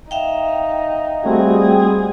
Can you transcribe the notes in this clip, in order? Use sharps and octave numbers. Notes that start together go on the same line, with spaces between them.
D#4 E5 F5 G5
G3 A3 C4 F#4 G#4 F#5